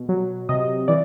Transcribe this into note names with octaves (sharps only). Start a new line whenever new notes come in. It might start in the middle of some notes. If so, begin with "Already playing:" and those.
Already playing: B2
F#3
C3 D#5
E3 D5